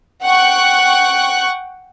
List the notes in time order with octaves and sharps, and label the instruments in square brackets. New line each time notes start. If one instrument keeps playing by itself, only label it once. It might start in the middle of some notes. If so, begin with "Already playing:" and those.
[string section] F#5 G5 C#6 F#6